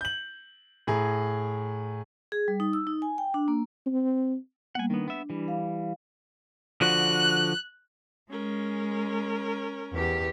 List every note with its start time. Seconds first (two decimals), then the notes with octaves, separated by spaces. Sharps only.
0.01 G6 F#7
0.87 A2 G#4 A#5
2.32 G#4
2.48 G3
2.60 D#4
2.73 E6
2.87 D#4
3.02 G#5
3.18 G5
3.34 D4
3.48 A#3
3.86 C4
4.75 G3 A#3 B3 F#5 G#5
4.90 D#3 B3 D4
5.08 B3 E5
5.30 E3 G3
5.48 F5
6.81 D3 F3 F#4 F#6
8.31 G#3 C#4 A#4
9.93 E2 G4